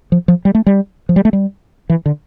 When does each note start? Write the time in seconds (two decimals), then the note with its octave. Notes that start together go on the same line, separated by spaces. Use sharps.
0.12 F3
0.28 F3
0.45 G3
0.55 A3
0.66 G3
1.09 F3
1.16 G3
1.25 A3
1.33 G3
1.90 E3
2.06 D3